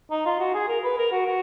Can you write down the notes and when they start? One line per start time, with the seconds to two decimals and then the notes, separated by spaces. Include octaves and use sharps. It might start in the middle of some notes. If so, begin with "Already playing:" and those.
0.11 D#4
0.26 F4
0.39 F#4
0.54 G#4
0.68 A#4
0.84 B4
0.98 A#4
1.12 F#4
1.26 F#4